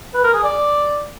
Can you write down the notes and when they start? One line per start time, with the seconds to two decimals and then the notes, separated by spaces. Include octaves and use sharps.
0.14 B4
0.24 A#4
0.34 G#4
0.44 D5